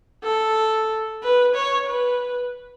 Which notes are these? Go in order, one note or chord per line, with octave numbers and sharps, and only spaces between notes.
A4
B4
C#5
B4